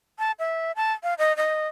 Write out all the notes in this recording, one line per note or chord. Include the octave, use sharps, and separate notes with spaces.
A5
E5
A5
F5
D#5
D#5